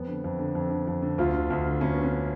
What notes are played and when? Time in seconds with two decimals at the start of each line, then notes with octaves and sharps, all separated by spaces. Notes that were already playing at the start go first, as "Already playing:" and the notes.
Already playing: F2 B3
0.08 D3
0.24 F2
0.39 D3
0.55 F2
0.71 D3
0.87 F2
1.02 D3
1.18 D2 F4
1.34 D3
1.50 D2
1.66 D3
1.81 D2 C#4
1.94 D3 B3
2.04 C#4